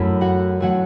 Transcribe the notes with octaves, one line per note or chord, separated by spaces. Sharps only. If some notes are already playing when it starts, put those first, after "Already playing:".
Already playing: F#2 F#3 A3 E4 E5
F#4 F#5
F#3 A3 F#4 F#5